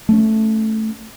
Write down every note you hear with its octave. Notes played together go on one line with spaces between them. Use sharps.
A3 C#4